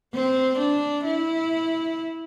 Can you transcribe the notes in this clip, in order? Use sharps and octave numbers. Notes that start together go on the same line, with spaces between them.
C4
D4
E4